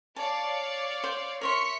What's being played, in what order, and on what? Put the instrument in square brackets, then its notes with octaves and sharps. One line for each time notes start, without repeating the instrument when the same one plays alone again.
[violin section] C#5 D5 F5 [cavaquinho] A5
[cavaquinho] C5
[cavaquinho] A#4 C#5 C6 [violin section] E5 B6 C#7